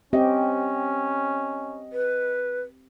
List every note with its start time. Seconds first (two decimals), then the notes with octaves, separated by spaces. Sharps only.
0.13 C4 C#4 G4 D#5
1.93 B4